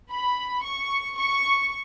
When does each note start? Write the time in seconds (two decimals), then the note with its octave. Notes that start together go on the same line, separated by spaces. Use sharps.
0.10 B5
0.63 C#6
1.17 C#6